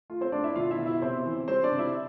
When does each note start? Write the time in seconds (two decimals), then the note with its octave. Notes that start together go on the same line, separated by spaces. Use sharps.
0.10 A3 F4
0.21 C4 C5
0.32 A3 D4 D5
0.44 E4 E5
0.56 B2 F4 F5
0.71 E4 E5
0.79 B2
0.86 E4 E5
1.02 C3 C4 C5
1.25 E3
1.48 G3 C4 C5
1.63 D4 D5
1.71 C3
1.79 E4 E5